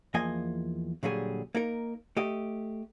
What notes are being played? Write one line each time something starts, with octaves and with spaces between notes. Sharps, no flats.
E2 F3 A#3 D#5 G#5
A#2 D3 F#3 G3 G#4
A#3 D#4 A#4
A3 G4 D#5